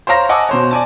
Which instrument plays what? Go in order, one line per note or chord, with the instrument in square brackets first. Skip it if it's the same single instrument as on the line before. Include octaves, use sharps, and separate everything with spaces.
[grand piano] C5 C#5 F5 A#5 A#6
D#5 F#5 G#5 A5 D6 E6
B2 C5 C#5
D5 G#5 A5